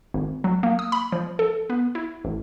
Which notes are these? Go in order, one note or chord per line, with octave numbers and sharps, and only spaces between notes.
G#1
F#3
A#3
D#6
B5
F3
A4
B3
E4
A1